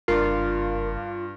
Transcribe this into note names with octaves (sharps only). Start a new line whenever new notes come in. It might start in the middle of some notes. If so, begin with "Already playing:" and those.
F#1 G2 F4 A#4 D5